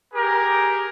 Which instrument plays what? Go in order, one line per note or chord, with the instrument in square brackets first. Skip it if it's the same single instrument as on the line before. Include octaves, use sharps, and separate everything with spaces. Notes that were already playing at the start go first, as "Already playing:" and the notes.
[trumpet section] G4 G#4 A#4